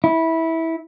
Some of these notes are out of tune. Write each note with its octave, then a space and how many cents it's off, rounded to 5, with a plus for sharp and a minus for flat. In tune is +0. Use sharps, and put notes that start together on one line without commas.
E4 -15